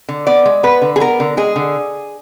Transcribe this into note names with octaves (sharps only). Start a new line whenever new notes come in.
D3
B3 D5
G#3
B3 B4
D3
G#4
B3 A#4
D3
G#3 G#4
D3